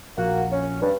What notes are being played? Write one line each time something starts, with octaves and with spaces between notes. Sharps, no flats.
A#1 A#3 F#4
C#4
G2